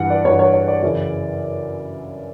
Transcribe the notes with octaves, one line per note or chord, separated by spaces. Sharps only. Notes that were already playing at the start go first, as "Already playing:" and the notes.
Already playing: G2 E3 F#5
D5
G2 E3 C#5
C#5
C#5
D5
F#2 C#3 E3